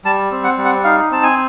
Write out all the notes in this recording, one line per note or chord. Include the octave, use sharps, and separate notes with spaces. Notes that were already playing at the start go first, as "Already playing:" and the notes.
G3 A5
C4
F#5
G3
F#5
D#4 F5
C4 A5
G#5